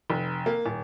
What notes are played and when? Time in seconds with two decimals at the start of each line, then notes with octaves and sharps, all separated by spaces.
0.10 F1
0.46 A#3
0.66 D#1